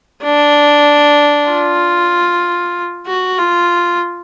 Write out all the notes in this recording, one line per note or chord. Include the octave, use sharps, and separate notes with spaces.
D4
F4
F#4
F4